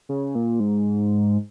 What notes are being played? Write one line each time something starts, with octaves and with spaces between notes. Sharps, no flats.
C#3
A#2
G#2